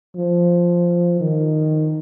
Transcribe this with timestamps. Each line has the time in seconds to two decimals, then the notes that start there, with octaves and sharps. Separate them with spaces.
0.16 F3
1.21 D#3